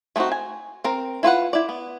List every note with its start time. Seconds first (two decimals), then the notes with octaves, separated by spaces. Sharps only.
0.16 A3 B3 C4 D#4 F#4
0.32 G#5
0.84 C4 A#4
1.23 E4 F4 B4 F#5
1.53 E4 D5
1.69 B3